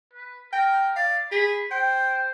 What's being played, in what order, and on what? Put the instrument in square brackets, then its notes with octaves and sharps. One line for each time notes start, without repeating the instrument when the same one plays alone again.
[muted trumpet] B4
[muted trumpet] A#4 [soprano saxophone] G5
[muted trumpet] D5 [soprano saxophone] F5
[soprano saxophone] G#4 [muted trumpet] B5
[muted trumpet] C5 [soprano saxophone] G5